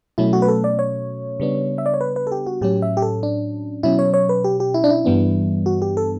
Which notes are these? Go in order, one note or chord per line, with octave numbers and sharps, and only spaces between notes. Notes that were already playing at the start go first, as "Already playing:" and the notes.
B2 F#3 A3 C#4 E4
F#4
B4
A4
D5
C#5
C#3 G3 B3 D4
E5
D5
C#5
B4
B4
A4
G4
F#4
A2 F#3 C#4 G4
E5
G4
A4
D4
B2 F#3 C#4 E4
C#5
C#5
B4
G4
G4
E4
D4
E4
G2 E3 G3 B3 D4
F#4
G4
A4